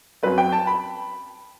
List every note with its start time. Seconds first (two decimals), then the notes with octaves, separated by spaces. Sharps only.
0.23 F#2 F#3 C4 B4
0.38 G5
0.52 A5
0.67 B5